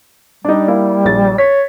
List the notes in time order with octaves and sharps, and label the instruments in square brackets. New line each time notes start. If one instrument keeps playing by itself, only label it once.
[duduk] G3 [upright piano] D4 D#4
[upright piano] A#3 E4 F5
A#1 A6
[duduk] C#5 [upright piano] B6